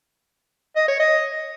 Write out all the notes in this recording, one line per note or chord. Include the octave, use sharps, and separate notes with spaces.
D#5
C#5
D#5